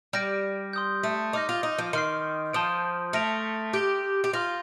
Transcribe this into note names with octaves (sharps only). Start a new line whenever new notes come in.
G3 F6 A#6 D7
C6 D#6 G6
A3
D#4 D6 F6 A#6
F4
D#4
F3
D#3 C6 F6 C7
F3 A5 C6 D#6 G6 D7
A3 F6 A#6 D7 F7
G4 G6 D7 G7
G4
F4 C6 F6 A#6